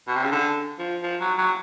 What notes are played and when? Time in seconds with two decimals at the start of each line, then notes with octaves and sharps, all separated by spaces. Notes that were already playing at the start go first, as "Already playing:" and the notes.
0.08 B2
0.16 C3
0.24 C#3
0.32 D3
0.79 F3
1.03 F3
1.20 F#3
1.38 F#3